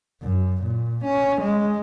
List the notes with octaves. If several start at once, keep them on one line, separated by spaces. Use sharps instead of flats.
F#2
A#2
C#4
G#3